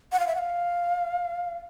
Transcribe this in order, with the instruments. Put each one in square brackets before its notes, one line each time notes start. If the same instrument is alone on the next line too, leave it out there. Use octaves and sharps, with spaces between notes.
[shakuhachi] F#5
F5
E5
F#5
F5